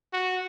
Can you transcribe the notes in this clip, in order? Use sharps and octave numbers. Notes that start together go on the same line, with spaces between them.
F#4